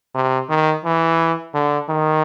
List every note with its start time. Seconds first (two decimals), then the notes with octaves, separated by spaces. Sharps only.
0.15 C3
0.49 D#3
0.85 E3
1.54 D3
1.89 D#3